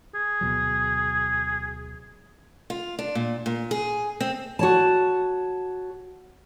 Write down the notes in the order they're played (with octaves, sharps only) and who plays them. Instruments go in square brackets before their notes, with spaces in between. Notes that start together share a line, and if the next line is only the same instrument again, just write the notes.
[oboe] G#4
[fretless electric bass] D2 B2 F#3
[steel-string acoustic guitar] F4
D4
A#2
A#2
G#4
C4
F#4 C#5 A5